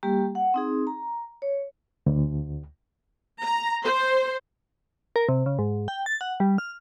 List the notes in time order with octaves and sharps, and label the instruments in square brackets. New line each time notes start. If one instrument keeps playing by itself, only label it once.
[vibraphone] G3 A#3 G4
F#5
C4 D#4 G#4
A#5
C#5
[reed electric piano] D2
[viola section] A#5
C5
[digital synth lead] A#4
C3
C#3
G#2
G5
A6
F#5
G3
F6